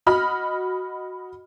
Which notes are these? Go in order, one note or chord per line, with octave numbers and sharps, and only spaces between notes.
F#4 D#5 B5 F6